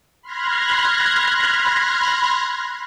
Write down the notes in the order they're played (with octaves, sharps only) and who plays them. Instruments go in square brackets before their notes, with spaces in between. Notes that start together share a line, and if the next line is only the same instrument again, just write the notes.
[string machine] B5 C6 F6 F#6 G#6 A#6